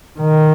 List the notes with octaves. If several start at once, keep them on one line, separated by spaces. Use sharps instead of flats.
D#3